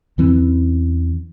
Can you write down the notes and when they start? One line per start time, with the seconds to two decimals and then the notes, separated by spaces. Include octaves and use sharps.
0.18 E2 E3 C4 C#4